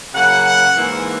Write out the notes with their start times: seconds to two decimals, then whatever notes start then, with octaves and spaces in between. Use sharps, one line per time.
0.13 C#3 F#3 A#3 F#5
0.46 F#5
0.77 G#2 E3 A#3